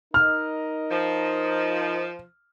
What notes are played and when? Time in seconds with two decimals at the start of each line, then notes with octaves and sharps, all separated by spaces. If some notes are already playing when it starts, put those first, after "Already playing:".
0.14 D#4 A#4 D#5 F6
0.90 F3